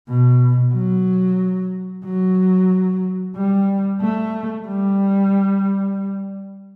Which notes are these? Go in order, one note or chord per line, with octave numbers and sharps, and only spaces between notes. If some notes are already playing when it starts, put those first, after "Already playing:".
B2
F#3
F#3
G3
A3
G3